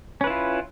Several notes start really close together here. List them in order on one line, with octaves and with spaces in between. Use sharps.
C#4 B4 E4 F4